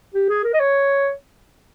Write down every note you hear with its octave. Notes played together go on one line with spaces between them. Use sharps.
G4
G#4
A#4
D#5
C#5